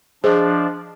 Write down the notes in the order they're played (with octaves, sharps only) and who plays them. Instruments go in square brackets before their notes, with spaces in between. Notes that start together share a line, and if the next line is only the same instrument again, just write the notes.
[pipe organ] F3 D4 [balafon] G#4 [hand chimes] C5 D#5